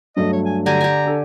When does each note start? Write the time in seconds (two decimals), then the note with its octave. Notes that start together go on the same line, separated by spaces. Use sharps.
0.17 G2 F#3 A3 D#5
0.33 C#5
0.46 G#5
0.66 D3 G4 G#5 A#5
0.81 G4 G#5
1.05 D4 A4